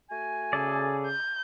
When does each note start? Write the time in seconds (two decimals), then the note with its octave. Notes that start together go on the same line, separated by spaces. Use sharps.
0.10 A3 F#4 G#5
0.53 C#3 G#4 A4 D5
1.06 G6